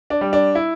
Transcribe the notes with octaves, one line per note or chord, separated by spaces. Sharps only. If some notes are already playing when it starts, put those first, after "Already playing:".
D4
G3
D4
E4